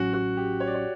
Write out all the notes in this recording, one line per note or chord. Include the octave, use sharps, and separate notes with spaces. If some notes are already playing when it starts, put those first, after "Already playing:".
Already playing: A1 A2 F#3 C#4 F#4
F#4
G4
C#5
D5
C#5